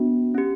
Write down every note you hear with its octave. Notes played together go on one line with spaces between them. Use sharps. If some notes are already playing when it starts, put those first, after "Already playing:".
Already playing: B3 D4 F#4
C#4 G4